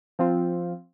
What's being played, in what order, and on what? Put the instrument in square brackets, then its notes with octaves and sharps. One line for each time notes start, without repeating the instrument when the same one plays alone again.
[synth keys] F3 C4 F4